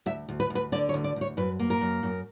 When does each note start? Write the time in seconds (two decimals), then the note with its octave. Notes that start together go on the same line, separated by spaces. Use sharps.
0.06 D2 E5
0.29 D2
0.40 B4
0.50 D2
0.55 B4
0.72 D3 D5
0.89 C#5
0.94 D2
1.04 D5
1.16 D2 C#5
1.37 F#2 B4
1.59 A#3
1.70 A#4
1.81 F#2
2.03 F#2